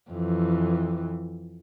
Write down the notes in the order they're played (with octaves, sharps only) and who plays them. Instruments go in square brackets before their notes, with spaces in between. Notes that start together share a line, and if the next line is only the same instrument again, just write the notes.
[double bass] F2 E3